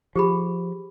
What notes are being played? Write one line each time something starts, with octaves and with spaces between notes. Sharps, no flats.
F3 G4 G#4 B5